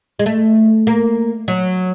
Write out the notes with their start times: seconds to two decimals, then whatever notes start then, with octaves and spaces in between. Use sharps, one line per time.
0.19 G#3
0.26 A3
0.87 A#3
1.48 F#3